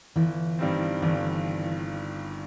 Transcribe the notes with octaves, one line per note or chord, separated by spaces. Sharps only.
G1 E3
G2 D#3 G3 C4
G1 E3